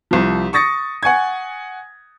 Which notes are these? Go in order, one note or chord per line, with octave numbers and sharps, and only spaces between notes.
C2 F3
C#6 D#6 A6 A#6 C#7
F#5 G#5 C#6 G#6